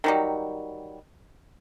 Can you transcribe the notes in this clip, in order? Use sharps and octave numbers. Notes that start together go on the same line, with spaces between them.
D#3 F#3 G3